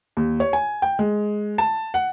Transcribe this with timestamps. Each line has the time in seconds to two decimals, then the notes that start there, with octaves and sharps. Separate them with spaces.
0.17 D#2
0.40 C#5
0.53 G#5
0.82 G5
0.99 G#3
1.58 A5
1.94 F#5